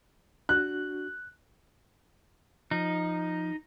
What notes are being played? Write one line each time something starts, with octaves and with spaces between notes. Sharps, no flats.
D4 F#4 F#6
F3 D#4